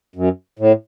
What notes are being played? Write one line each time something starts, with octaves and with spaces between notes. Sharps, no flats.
F#2
A2